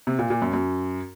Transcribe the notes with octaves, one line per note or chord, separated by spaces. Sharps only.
C3
A#2
A#2
F#2
F#2